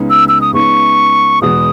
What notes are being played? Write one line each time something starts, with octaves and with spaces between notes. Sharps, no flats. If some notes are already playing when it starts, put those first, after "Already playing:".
Already playing: C#2 C#3 G#3 B3 D#4
E6
E6
D#6
C#2 C#3 G#3 B3 D#4 C#6
E2 B2 G#3 B3 F#4 D#6